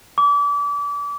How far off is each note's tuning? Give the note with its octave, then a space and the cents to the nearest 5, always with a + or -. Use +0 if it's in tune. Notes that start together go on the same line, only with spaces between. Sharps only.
D6 -35